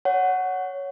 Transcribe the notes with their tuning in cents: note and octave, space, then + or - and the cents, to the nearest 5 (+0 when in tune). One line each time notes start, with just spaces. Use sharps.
C#5 +10 F#5 +0